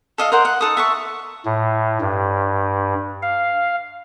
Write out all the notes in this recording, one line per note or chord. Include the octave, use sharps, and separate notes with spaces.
A4 D#5 F5
A#4 C5 F#5 C6
F#5
D#4 A4 D#6
E5 A5 C#6
A2
G2
F5